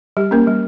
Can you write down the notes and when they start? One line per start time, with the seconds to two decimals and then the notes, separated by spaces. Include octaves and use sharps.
0.17 G3 G4
0.31 A#3 C#4 A#4
0.47 G3